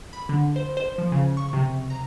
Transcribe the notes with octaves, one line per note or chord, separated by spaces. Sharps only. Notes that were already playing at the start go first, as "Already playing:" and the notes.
B5
D3
C5
C5
F3
C#3
C#6
C3
A#5